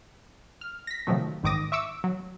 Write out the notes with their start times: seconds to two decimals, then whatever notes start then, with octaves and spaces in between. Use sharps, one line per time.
0.61 F6
0.87 A#6 B6
1.07 C3 D#3 F3 F#3 A3
1.43 A1 G#2 D#3 D6 D#6 A#6
1.72 E5 C#6 D6 E6
2.04 F#3